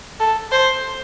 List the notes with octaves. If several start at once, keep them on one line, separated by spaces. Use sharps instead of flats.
A4
C5